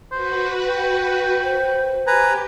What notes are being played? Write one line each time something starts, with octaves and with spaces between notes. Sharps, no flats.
F#4 B4 C5
G5
C5
G4 B4 G#5 A#5